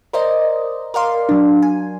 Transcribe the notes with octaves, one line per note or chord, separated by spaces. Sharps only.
A#4 C5 D5 D#5
A#4 D5 F5 C6
F#3 D4
G#5